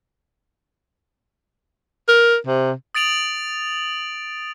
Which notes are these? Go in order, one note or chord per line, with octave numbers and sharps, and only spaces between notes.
A#4
C3
D#6 A6 D7 F7 F#7